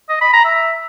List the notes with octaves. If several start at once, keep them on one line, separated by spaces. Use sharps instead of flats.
D#5
B5
A#5
E5